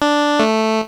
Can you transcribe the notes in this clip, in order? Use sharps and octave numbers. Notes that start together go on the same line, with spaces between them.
D4
A3